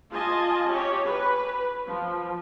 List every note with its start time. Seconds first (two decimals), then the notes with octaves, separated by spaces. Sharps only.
0.11 F4 D#5 G#5 A5
0.67 C#4 G4 C#5
1.05 B4
1.87 F3